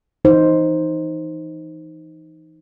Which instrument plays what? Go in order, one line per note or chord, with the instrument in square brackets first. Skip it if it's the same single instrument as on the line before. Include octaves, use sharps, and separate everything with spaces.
[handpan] E3 D#4 C5